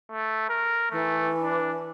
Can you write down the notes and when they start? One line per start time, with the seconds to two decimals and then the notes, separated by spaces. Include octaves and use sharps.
0.12 A3
0.50 A#4
0.91 E3 A3
1.42 D4